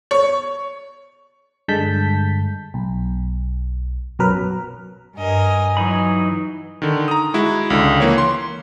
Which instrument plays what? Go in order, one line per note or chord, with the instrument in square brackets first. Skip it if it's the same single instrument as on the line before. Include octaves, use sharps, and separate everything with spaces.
[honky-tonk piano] C#5
[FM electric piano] G2 D3 G#3 A5 G6 B6
B1
B1 F#2 F#3 A#4 B4 F6
[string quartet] G2 A#4 D#5 [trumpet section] G#5
[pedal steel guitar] E3 D#4 B5 [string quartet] F#3
[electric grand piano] D3 D#3
A#5 D#6
G#3 E4 F#4
C#2 D3
E3 A#3 C#5
C6